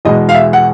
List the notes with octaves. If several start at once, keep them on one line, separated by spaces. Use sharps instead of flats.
E2 B2 G#3 B3 D#5
F5
E5
F#5